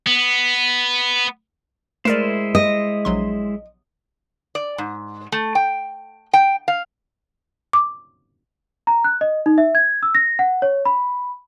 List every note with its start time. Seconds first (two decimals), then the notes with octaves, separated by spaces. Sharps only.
0.07 B3
2.05 G#3 A3 E4 A#4 C5 D5
2.55 D#5
3.05 A#1 F#3 C6
4.55 D5
4.78 G#2
5.32 A3
5.55 G5
6.33 G5
6.68 F5
7.73 D6
8.87 A#5
9.04 F#6
9.21 D#5
9.46 D#4
9.58 E5
9.75 G#6
10.03 E6
10.15 A#6
10.39 F#5
10.62 C#5
10.85 B5